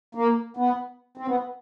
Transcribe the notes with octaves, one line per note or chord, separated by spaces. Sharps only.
A#3
B3
C4
B3